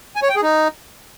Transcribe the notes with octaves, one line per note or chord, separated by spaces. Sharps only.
G#5
C#5
G5
G#4
D#4